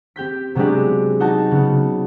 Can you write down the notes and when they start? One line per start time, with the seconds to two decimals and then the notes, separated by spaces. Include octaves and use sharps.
0.16 C4 G4 G6 B6
0.55 C3 F#3 G#3 B3 D4 G4
1.20 D#4 F#4 A5
1.51 C#3 B3